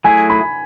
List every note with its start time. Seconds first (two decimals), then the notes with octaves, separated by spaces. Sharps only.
0.04 F#3 A3 E4 G#4 G#5
0.30 B5